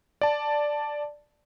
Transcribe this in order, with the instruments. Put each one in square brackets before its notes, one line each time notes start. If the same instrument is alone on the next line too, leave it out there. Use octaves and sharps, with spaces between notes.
[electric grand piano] D5 A5